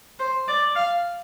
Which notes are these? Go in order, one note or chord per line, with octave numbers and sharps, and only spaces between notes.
C5
D5
F5